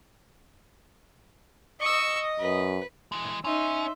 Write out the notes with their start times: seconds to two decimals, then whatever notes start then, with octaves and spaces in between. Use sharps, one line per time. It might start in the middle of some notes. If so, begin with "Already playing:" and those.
1.80 D#5 C#6 E6
2.39 F#2 B4
3.12 E3 G#3
3.44 C#4 D#4 E5 C6